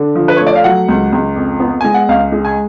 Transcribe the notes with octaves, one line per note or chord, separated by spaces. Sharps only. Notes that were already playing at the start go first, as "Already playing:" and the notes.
Already playing: D3
F3
B4
C#5
A3
D5
F5
F#3 F#5
C#2
C#2
F2
B3
G#3 G#5
F#5
C#2 F5
G#3
G#5